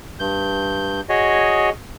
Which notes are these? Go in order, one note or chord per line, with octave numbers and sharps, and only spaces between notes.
G2 G6
F#4 G#4 C#5 D#5